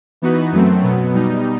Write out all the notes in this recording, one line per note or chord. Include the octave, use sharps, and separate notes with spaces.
E3 B3 D#4 F#4 B4
F#2 F#3 A3 C4
B2 F#3 B3
B2 G3 D#4